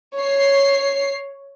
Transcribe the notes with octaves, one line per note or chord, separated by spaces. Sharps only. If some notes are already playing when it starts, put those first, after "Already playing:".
C#5 C7